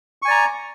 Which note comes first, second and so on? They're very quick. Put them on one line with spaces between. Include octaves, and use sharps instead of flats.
C#6 G#5 D5 A#5